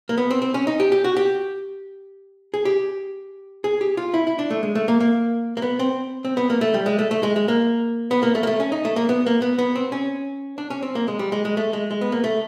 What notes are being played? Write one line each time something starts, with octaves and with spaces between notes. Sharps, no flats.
A#3
B3
C4
C4
C#4
D#4
G4
G4
F#4
G4
G#4
G4
G#4
G4
F4
E4
E4
D4
A3
G#3
A3
A#3
A#3
A#3
B3
C4
C4
B3
A#3
A3
G3
G#3
A3
A3
G#3
G#3
A#3
B3
A#3
A3
A#3
A3
C#4
D#4
A3
A#3
B3
A#3
B3
B3
C4
C#4
D4
C#4
C4
A#3
G#3
G3
G#3
G#3
A3
G#3
G#3
B3
A#3
A3